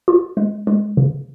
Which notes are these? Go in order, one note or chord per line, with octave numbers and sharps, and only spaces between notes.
F4
G#3
G#3
C#3